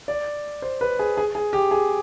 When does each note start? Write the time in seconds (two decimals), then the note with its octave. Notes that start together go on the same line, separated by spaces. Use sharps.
0.08 D5
0.62 C5
0.81 B4
0.99 G#4
1.17 G#4
1.35 G#4
1.53 G4
1.71 G#4